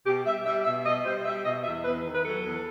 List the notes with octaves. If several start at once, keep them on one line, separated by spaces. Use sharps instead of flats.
B2 G4
G3 E5
G3 E5
B2 E5
B2 D#5
G3 C5
G3 E5
B2 D#5
E2 E5
E2 B4
D#3
B4
F#3 A4
E2